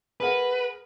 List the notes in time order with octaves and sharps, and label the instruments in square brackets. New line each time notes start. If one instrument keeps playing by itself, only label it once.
[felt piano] G#4 A#4 F#5 [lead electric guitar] B4